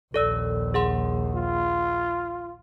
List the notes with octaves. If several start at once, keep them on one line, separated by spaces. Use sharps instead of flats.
A#1 D#2 A4 D5 E6
G#4 F#5 C6
F4